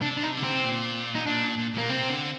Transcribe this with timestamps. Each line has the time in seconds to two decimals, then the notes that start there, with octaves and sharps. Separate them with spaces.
0.01 C3 D4
0.17 D4
0.23 D#4
0.37 D3
0.44 C4
0.51 C3
0.64 A#2
1.15 D#4
1.26 A#2 D4
1.58 A#2
1.74 A#2 A#3
1.89 C3 C4
2.09 D3